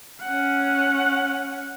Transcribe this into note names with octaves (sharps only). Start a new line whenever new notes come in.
C#4 F#5